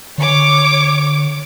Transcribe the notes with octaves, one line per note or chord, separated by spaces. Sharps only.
D3 C#5 D6